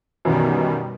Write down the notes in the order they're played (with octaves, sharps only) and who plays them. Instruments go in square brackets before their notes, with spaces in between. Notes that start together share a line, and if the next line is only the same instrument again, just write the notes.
[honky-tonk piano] F#2 E3 [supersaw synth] B2 D#3 G3